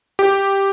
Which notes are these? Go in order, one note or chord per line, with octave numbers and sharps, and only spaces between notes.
G4